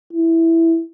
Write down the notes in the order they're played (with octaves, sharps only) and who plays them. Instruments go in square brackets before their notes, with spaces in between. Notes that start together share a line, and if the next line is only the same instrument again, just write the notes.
[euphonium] E4